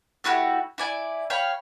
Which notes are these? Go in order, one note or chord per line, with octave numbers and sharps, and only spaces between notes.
A3 E4 F#4 G4
E4 D5 G#5
C#5 F5 G5 B5